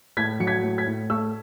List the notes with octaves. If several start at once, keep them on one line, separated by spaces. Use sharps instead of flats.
A2 G#6 B6
F#3 C#7
G#6 B6
A2
G#6 B6
A2
A3 C#6 E6